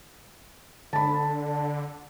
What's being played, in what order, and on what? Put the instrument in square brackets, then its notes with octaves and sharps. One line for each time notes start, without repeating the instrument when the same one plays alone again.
[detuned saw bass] D3 [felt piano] A5 B5